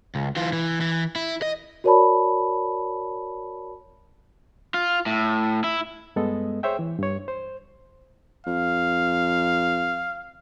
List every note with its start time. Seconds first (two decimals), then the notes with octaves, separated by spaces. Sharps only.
0.15 C#2
0.36 E3 F4
0.53 E3
0.81 E3
1.16 E4
1.42 D#5
1.84 F#4 A#4 C#5 D5 A5 B5
4.74 F4
5.06 A2
5.64 E4
6.16 G2 G#3 B3 A4 D#5
6.63 G#4 C5 C#5 E5 G5
6.79 E3
6.99 G2 C#5
7.28 C5
8.47 F2 F5